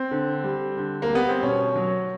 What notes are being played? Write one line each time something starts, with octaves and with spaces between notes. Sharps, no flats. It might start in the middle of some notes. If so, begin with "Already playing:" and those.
Already playing: C4
D3
G3
D3
A#3
G3 B3
C4
B2 C#4
F#3